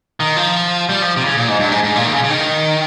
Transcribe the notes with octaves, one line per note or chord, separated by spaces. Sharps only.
D#3
F3
G3
F3
C3
C#3
A#2
G#2
G2
G#2
G#2
A#2
D#3
C#3
C#3
D#3